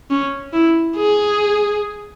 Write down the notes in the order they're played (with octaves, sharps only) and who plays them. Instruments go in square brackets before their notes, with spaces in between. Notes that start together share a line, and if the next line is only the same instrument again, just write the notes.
[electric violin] C#4
E4
G#4